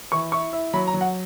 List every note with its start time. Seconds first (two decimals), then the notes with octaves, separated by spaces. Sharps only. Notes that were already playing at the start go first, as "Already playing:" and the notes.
0.12 E3 C#6
0.32 E4 C#6
0.53 E4
0.74 F#3 B5
0.87 A#5
0.94 F#3
1.01 F#5